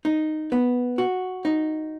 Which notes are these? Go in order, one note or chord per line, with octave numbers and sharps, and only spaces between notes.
D#4
B3
F#4
D#4